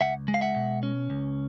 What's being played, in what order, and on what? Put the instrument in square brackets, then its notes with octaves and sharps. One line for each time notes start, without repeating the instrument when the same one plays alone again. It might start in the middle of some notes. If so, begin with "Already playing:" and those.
[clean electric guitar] C#2 E5 F#5
G#3
F5
E5 F#5
B2
C#4
C#2